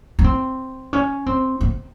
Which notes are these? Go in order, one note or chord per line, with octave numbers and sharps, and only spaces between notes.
C#4
C4
C#4
C4
C4